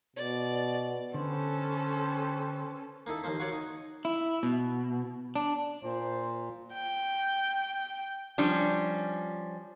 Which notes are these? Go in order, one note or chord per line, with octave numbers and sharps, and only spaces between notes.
B2 D5
D3 C#4 G4 A4 B4 C5
A#3 D#4 E4 A4
D#2 F3 A#3 C5
F4 F#4 A#4 C#5 D5
D#4
E4
B2
D4
A#2 C5
G5
F3 G3 C#4 D4